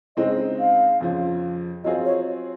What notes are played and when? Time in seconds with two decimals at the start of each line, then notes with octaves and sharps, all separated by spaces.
0.17 C#3 G#3 C4 D#4 D#5
0.59 F5
1.01 F2 C#3 F3
1.84 F#3 C4 F4 G#4 D#5
2.05 C#5